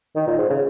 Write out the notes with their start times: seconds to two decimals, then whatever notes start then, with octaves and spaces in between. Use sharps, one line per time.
0.16 D#3
0.27 A#2
0.38 G#2
0.49 C#3